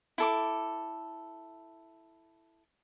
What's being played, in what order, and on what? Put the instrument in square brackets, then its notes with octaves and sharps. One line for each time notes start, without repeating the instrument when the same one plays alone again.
[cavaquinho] E4 A4 D6